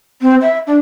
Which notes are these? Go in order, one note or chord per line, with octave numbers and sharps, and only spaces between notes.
C4
E5
D4